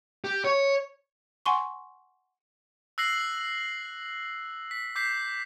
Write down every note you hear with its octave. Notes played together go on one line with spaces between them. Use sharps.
G4
C#5
F#5 G#5 C6 C#6
E6 F#6 A#6 C7 F#7
B6
D6 G6 B6 C7